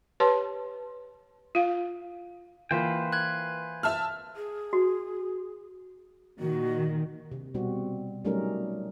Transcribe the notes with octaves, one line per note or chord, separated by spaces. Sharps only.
G4 B4 C#5 A5 C6
F4 F5
E3 A#3 F4 B4 C5 G5
F#6 G#6
E5 A5 F6
G#4
F#4
A#2 D#3 F#4
C3
B2 G3 C4 F#4
F#3 G3 A3 C#4 D#4 A#4